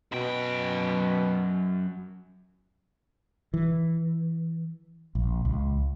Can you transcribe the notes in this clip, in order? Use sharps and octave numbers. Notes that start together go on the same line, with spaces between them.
F#2 B2 G5
E3
A#1
C#2